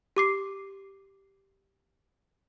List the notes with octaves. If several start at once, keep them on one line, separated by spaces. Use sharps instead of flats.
G4 D6 C7